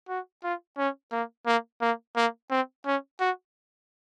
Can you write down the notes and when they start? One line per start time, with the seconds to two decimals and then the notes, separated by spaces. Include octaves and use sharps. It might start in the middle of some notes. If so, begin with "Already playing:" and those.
0.09 F#4
0.43 F4
0.78 C#4
1.12 A#3
1.46 A#3
1.81 A#3
2.16 A#3
2.51 C4
2.86 C#4
3.20 F#4